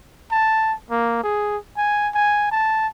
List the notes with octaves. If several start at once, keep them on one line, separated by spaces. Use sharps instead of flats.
A5
A#3
G#4
G#5
G#5
A5